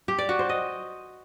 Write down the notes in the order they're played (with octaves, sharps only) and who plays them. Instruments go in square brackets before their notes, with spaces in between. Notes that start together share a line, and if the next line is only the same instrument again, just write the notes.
[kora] G4
D5
F#4
C5
D#5